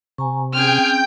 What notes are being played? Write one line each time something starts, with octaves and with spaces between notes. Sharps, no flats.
C3 G#5 A#5 C#6
C4 C#4 G#4 G5 F6 G6